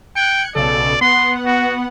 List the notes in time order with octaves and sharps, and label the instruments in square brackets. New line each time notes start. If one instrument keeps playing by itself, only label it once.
[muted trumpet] G5 [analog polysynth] F#6 G#6 C#7
[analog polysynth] B1 C#3 A4 [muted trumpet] D5
[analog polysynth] B3 F#5 [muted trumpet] C6
[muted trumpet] F#4